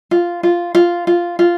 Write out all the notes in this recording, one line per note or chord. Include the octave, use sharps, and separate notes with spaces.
F4
F4
F4
F4
F4